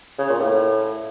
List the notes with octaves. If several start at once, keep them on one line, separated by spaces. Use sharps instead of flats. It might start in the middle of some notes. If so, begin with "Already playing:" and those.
C#3
A#2
A2